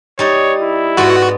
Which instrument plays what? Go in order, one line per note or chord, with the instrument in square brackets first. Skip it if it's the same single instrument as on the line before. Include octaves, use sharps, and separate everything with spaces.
[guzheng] G3 D#4 [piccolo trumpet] C#5
[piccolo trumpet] E4
[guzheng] G#2 B3 [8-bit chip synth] F#4